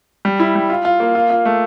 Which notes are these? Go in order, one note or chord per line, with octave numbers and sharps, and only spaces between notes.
G3
E4
G3
F4
F4
A#3
F4
F4
A3